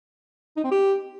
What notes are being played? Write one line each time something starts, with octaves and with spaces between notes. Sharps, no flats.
D#4
C4
G4